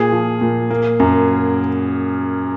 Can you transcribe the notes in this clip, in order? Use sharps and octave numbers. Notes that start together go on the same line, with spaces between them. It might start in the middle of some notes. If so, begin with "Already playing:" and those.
Already playing: A#2 G#4
F3
A#2
A#3
F#2